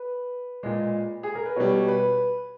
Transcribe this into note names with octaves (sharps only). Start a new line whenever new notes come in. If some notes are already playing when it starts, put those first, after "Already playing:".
Already playing: B4
A#2 G#3
G#4
A#4
B4
B2 G3 C#5
B4